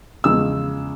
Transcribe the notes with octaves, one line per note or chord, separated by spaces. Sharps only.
E2 C#3 F3 G#3 E6